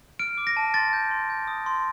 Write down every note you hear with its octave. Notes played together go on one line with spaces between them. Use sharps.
F6 D7
D6
A#6
A5
C6 A6
G6
C6
G6
D#6
C6